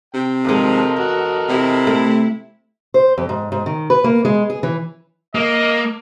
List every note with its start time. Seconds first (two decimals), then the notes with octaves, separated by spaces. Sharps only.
0.14 C3 G5
0.45 D#2 F3 G#3 A4 A#4 D#5
0.97 E2 F#4
1.49 C3 E4
1.87 A3
2.94 C5
3.18 F2
3.29 G#2
3.52 G#2
3.66 D#3
3.90 B4
4.04 A#3
4.25 G#3
4.50 G#4
4.63 E3
5.35 A#3 D#5